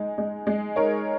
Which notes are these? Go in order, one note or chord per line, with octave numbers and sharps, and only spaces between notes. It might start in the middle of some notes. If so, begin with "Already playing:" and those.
Already playing: G#3 D#4
G#3
G#3
D#4 A#4 C#5